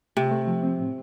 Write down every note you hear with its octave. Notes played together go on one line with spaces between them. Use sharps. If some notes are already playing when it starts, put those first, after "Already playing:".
C3 A3
A3
F3
C4
A2